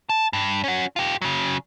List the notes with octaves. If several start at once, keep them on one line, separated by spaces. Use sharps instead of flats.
A5
G2
C#4 F#4
F4 G4
C#3 F#3